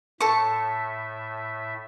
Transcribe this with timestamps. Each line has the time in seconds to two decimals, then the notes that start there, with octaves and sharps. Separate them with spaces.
0.21 A2 A4 E5 C#6